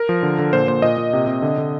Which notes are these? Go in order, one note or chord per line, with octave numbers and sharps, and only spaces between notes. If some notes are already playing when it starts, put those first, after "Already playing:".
Already playing: A#4
F3
D3
D3
A#2 C5
A#2 C5
A#2 D#5
A#2
C3
C3
D3
D3